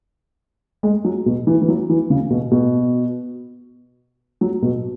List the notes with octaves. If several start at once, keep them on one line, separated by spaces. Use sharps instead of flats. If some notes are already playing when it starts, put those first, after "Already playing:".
G#3
F#3
B2
E3
E3
F#3
E3
C#3
B2
B2
F#3
B2